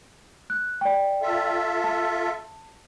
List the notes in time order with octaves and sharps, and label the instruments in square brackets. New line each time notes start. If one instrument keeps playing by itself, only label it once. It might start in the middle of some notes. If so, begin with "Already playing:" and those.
[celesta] F#6
D5 G5
[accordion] F4 A4 E5
[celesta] A5